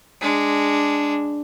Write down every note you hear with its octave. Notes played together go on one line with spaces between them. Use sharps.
G#3 D4